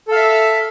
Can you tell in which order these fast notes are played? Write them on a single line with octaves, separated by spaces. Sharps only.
A4 F5 E5